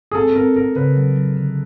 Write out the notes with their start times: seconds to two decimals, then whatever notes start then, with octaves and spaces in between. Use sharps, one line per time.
0.11 G#4
0.15 C4 A4
0.36 C4 A#4
0.56 C4 A#4
0.75 C#3 B4
0.97 F#3
1.16 F#3
1.37 D3